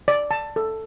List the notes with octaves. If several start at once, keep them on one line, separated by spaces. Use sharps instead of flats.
D5
A5
A4